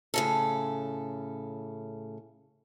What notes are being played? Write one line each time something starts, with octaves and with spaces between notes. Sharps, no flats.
A2 C#3 A4